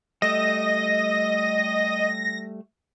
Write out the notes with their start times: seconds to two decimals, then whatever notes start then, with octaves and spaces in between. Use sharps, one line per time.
0.22 G3 A3 D#5 A#6